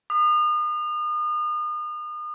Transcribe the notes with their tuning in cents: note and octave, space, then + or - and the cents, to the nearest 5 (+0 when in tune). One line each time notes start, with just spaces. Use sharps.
D#6 -40